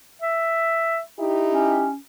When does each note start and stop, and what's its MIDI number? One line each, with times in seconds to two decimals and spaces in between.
0.22 1.00 76
1.19 1.89 63
1.19 1.89 64
1.19 1.89 67
1.51 1.96 61